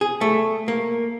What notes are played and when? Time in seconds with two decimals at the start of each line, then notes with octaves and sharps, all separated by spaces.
0.01 G#4
0.21 A3
0.68 A#3